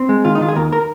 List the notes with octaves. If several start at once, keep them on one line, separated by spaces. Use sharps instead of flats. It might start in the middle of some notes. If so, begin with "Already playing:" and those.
Already playing: C4
G#3
D#3 F4
D#4
D#3 F4
G#4
D#2 A#4
A#4